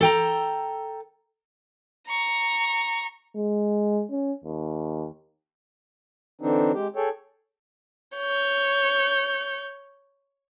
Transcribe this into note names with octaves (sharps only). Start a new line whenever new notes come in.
A4 G5 A#5
A#5 C#6
G#3
C#4
D#2
D3 E3 C4 D4 D#4
G#3 G4
G#4 A4 C#5 G5
C#5 G6